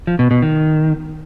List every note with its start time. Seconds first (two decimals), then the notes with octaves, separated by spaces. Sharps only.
0.07 F3
0.19 B2
0.31 B2
0.42 D#3